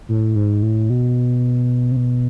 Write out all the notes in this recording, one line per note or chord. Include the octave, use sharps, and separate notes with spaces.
A2
G#2
A2
B2
C3
B2